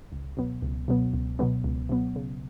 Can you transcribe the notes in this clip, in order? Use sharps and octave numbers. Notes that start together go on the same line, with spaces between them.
C#2
B2 F#3 B3
C#2
B2 F#3 B3
C#2
B2 F#3 B3
C#2
B2 F#3 B3
C#3